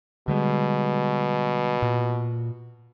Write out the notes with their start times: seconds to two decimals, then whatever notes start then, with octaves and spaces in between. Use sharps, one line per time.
0.28 B2 D3 G3 G#3
1.82 A#2